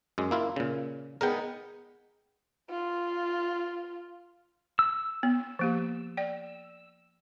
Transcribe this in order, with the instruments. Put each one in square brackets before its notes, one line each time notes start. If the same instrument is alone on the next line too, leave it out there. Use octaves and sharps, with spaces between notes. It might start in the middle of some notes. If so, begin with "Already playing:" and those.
[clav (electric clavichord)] F#2 G#3
A#3 E4 F4
A#2 C#3
[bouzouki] G#3 B3 D#4 [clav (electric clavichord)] A#4 G5
[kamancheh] F4
[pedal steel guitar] E6
[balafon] B3
F3 A#3 G4
D5 G5